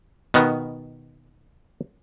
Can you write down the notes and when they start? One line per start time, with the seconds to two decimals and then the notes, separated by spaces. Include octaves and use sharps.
0.34 B2 D#3 B3